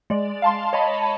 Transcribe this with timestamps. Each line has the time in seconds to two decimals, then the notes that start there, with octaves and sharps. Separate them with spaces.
0.10 G#3 D5
0.42 F5 A5 C6
0.73 C#5 D#5 A5 B5